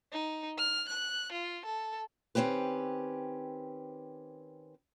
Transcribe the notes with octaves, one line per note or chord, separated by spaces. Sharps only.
D#4
F6
F#6
F4
A4
D#3 C4 C#4 G4 B4